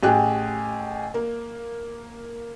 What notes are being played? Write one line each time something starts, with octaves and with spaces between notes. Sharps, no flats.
A1 G4 G#4 F#6
A#3